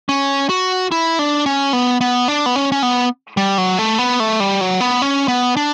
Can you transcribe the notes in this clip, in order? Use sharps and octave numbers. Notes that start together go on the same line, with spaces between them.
C#4
F#4
E4
D4
C#4
B3
B3
D4
B3
C#4
C#4
B3
G3
F#3
A3
B3
A3
G3
F#3
B3
C#4
B3
D4